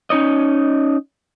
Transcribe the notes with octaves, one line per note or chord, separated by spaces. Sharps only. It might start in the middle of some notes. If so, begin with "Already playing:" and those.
C#4 D#4 C#5 D#5